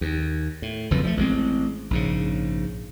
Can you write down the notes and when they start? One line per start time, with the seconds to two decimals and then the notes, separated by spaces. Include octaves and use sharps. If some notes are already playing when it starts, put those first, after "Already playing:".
0.01 D#2
0.62 A2
0.91 F#1 F2 A#2 E3
1.03 F3 F#3 A3
1.17 A1 G#3 C4
1.91 A#1 G#2 C#3